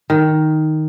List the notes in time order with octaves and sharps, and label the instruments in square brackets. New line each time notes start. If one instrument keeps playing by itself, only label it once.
[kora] D#3